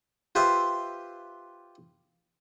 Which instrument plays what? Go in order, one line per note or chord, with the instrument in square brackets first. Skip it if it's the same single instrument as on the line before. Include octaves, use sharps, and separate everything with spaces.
[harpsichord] F4 G4 B4 C5 E5